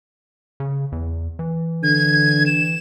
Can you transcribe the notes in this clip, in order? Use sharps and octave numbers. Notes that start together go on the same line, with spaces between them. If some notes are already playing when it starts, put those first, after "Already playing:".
C#3
E2
E3
D3 G#6
E7